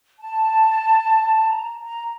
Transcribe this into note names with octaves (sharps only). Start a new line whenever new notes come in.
A5
A#5
A#5